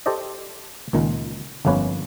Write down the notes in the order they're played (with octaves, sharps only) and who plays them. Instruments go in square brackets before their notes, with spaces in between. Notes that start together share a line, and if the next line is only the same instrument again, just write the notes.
[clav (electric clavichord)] G4 A4 C5 D5 D#5
C#2 A#2 D#3
G1 F2 A#3 C#4 B4 C#5